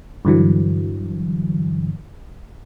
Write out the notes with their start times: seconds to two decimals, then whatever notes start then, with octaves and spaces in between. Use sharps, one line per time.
0.25 G2 D3 E3 F#3